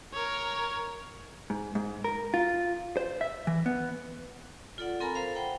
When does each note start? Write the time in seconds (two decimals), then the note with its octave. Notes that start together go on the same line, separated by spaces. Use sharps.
0.13 A#4 C#5
1.50 G#2
1.75 G#2
2.04 A#4
2.34 F4
2.97 C5
3.21 E5
3.47 E3
3.66 B3
4.78 F4 A4 D5 F#5
5.00 C4 A4 A#4 G#5 A#5 B5
5.15 A4 C5 F5
5.35 C5 F#5 G5 B5